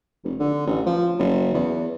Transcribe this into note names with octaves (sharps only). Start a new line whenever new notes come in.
F1
D3
A1
F3
F#1
E2